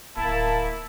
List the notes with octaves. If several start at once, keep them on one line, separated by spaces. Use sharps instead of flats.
D1 A#3 E4 A5